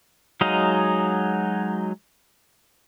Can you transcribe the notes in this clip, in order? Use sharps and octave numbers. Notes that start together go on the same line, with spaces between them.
F#3 G#3 D#4 D#5 F5